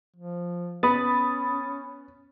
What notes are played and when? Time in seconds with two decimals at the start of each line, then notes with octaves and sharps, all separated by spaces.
0.16 F3
0.83 B3 C#4 B5 D#6 A6